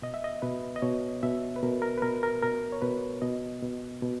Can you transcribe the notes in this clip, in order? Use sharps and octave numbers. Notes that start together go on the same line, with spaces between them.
B2 D#5
E5
D#5
B2 B4
D#5
B2 C#5
B2 E5
B4
B2 A#4
A#4
B4
B2 A#4
A#4
B2 A#4
C#5
B2 B4
B2 D#5
B2
B2